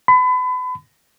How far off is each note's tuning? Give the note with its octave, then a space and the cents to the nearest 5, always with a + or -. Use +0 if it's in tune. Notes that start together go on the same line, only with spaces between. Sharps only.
B5 +35